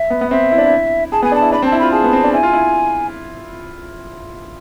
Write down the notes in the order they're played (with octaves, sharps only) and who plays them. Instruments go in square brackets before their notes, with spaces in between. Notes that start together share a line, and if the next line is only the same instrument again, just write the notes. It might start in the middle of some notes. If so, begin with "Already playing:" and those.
Already playing: [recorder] E5
[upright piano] B3
B3
[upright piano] C4 [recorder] E5
[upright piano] E4
D4
E4
[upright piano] G#4 [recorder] A5
[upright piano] B3 [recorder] G#5
[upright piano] D4
[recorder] A5
[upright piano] E4
[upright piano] D4 [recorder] B5
[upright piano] C4
[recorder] A5
[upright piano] E4
[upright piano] F4 [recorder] B5
[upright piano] G#4 [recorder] A5
[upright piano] B3
C4
D4
[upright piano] E4 [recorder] G#5
[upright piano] F4
E4